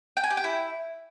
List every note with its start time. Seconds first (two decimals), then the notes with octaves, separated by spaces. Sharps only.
0.17 G5
0.24 G#5
0.30 G4
0.37 G5
0.44 E4